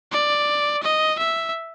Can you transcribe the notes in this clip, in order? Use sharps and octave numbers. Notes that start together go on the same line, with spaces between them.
D5
D#5
E5